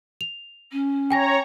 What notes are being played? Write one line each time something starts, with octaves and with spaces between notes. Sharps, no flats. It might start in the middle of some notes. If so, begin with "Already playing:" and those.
F7
C#4
C#5 G5 G#5 A#5 A#6